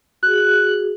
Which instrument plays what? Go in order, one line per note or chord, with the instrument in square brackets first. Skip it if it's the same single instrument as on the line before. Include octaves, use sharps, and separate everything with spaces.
[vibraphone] F#4 G#4 [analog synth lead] F#6